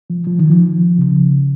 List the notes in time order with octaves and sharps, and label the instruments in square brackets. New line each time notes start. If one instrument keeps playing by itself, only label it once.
[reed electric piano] F3
F3
D#3
F3
C#3